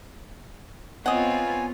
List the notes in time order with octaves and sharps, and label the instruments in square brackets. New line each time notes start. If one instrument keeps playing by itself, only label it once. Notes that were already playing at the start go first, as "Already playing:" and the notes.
[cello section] B3 F4 [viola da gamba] C4 C#5 [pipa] D#5 F#5 [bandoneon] G#5